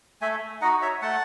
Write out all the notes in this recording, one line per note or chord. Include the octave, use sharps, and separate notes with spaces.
A3 E5 G#5
D#4 F#4 D#5 F#5
C#5 E5
A3 F#5 A5